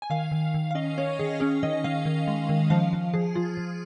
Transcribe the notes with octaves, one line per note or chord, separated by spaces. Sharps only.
G#5
D#3 F5
D#3
D#3
F5
C#4 D#5
C#4 C#5
D#3 G#4
C#4 G#4
D#3 D#5
D#3 F5
D#3
G#3
D#3
F3 F5
F3
F3 G#4
F3 F4
F3